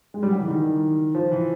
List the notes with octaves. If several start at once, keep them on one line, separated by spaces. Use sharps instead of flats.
G#3
G3
F#3
E3
D#3
F3
E3